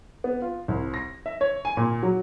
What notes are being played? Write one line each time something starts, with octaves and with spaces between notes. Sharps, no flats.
B3
F4
C2
A#6
E5
C#5
G#5
A#2
F#3